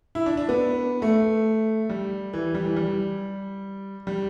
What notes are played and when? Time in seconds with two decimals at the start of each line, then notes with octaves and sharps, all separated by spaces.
0.15 E4
0.26 D4
0.37 D4
0.49 B3
1.02 A3
1.89 G3
2.34 E3
2.55 G3
2.66 E3
2.76 G3
4.07 G3